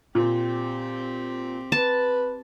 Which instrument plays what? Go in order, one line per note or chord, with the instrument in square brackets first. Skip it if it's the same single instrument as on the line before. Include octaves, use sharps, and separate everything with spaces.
[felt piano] A#2 [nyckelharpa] C4 G4
[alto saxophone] B4 [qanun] A5